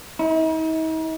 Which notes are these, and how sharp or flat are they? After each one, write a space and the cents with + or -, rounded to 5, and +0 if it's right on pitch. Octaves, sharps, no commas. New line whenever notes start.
D#4 +45